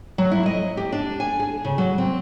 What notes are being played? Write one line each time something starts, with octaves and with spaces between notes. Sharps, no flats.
F#3
E4
D#5
G4
D4
G#5
G#4
C#3
F#3
C4